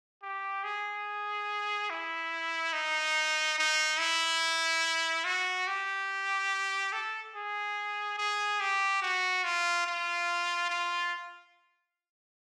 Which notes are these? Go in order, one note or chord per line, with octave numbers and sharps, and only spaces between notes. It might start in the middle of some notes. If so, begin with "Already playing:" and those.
G4
G#4
E4
D#4
D#4
E4
F#4
G4
A4
G#4
G#4
G4
F#4
F4
F4
F4